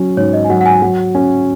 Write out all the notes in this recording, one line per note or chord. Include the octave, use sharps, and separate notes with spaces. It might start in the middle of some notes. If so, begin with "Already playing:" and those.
Already playing: F#3 C#4
G#2 C#5
D#5
G#5
F#3 F#5
F#5
G#5
F#3 F#5
C#4